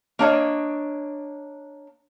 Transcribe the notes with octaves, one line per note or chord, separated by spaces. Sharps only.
A#3 D4 C#5 D#5